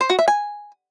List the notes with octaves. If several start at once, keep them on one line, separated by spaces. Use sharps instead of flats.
C5
F#4
E5
G#5